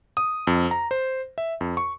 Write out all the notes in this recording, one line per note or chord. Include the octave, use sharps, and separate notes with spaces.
D#6
F2
A#5
C5
E5
F2
C#6